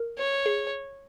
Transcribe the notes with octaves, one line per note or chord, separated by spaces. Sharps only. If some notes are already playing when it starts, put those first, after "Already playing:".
Already playing: A#4
C#5
G#4